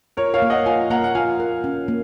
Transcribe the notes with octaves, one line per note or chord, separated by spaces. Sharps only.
F4 A#4 C#5
C#5 F5
A#3
D#5 F#5
F4 F5 G#5
A#3 F#5 A#5
F#5
F4 F5 G#5
A#4
C#4
A#3